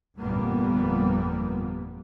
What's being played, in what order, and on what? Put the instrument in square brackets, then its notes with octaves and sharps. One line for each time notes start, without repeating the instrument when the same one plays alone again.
[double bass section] G1 F2 A#2 G3 A#3 B3